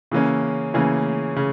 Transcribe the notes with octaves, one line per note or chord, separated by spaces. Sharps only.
C#3 E3 A#3 C#4
C#3 E3 A#3 C#4
C#3